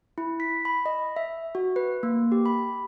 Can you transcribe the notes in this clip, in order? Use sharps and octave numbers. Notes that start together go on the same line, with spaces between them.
E4
B6
B5
D#5
E5
F#4
B4
A#3
G4
B5